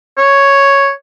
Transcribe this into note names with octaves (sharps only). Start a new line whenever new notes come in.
C#5